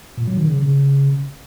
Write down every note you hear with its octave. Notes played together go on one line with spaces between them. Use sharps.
A#2
F#3
D#3
C#3
C#3